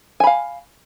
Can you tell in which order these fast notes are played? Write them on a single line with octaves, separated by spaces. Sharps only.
G#5 B5 F5